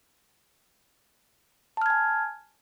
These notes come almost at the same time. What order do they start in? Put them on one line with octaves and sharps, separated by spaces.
A5 F6 G#6 G#5